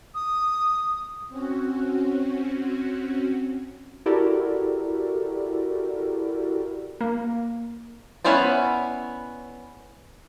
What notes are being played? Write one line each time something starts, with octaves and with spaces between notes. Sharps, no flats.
D#6
C4 C#4 F#4
E4 F#4 G4 A4 A#4 D5
A#3
B3 C#4 E4 C5 D5